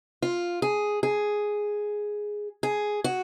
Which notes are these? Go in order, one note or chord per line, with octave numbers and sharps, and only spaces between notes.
F4
G#4
G#4
G#4
F#4